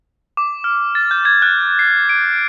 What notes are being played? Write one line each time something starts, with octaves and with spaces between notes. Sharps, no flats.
D6
F6
A6
G6
G#6
F#6
C7
D7